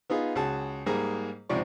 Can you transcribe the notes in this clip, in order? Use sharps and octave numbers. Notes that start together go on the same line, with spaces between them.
B3 D#4 F4 G#4
C#2 F#4 G#4 A5
G#2 G3 A#3 G#4 A#5
C#2 G#2 C3 F3 D5 C#6